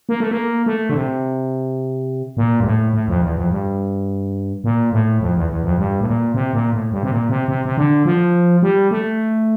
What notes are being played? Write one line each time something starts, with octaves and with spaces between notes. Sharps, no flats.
A#3
A3
A#3
A3
D3
C3
A#2
G2
A2
A2
F2
E2
F2
G2
A#2
A2
F2
E2
E2
F2
G2
A2
A#2
C3
A#2
A2
G2
C3
A#2
C3
C3
C3
D3
F3
G3
A3